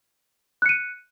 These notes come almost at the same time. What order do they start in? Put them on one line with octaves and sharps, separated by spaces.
F#6 C#7 D#7